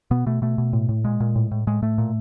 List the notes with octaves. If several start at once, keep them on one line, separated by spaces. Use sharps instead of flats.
B2 B3
B2 A3
B2 A3
B2
A2
A2
A#2 G#3
A#2
A2
A2
A2 G#3
A2 A3
A#2